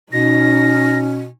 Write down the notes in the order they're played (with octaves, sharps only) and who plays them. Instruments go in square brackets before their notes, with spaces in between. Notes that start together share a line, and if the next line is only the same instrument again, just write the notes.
[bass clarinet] B2 [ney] C#4 [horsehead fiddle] D#4 [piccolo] A#6